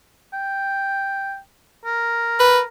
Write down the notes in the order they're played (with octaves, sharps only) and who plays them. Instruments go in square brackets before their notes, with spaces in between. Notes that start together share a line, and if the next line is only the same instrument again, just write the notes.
[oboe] G5
A#4
[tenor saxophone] B4